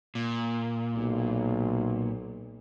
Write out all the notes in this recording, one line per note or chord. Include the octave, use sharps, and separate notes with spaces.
A#2
B1